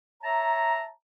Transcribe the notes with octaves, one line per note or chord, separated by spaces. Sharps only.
C#5 E5 A5 A#5